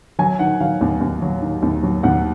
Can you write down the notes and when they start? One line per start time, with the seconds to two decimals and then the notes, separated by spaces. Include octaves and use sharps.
0.19 F#3 G#5
0.39 D#3 F#5
0.60 F#3 F5
0.81 D#2
1.01 D#2
1.22 F#3
1.42 D#3
1.62 D#2
1.83 F#3
2.03 D#2 F#5